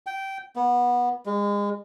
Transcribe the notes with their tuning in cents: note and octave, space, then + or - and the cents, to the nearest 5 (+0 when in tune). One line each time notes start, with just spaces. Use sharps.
G5 -15
B3 -20
G#3 -30